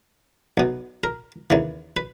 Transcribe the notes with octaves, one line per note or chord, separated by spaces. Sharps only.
B1 B2
A#4
D#2 C#3 E3
B4